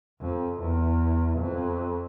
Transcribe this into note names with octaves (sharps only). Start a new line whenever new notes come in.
F2
E2
F2